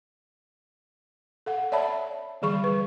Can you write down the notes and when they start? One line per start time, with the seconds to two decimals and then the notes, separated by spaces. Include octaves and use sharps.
1.46 A4 F5 F#5
1.72 C#5 D5 E5 A5 B5
2.42 D3 E3 G3 G#4 B5 C#6
2.64 G3 B4